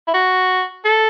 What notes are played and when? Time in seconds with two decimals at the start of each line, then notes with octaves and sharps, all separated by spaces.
0.08 E4
0.14 F#4
0.85 A4